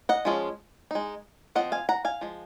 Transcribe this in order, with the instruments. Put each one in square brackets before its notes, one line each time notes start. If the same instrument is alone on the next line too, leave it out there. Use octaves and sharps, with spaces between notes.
[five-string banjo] D#5 F#5
F3 G#3 C#4 F4
G#3 D#4
F3 C4 F4 D#5 F#5
F5 G#5
F#5 A#5
F5 G#5
F3 G#3